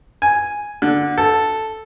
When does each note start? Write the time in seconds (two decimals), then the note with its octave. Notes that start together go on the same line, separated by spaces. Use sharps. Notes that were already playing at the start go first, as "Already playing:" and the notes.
0.22 G#5
0.82 D3
1.18 A4